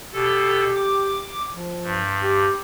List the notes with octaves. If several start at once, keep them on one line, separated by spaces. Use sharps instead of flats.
B2 G4 A4
D6
F3
G2
G4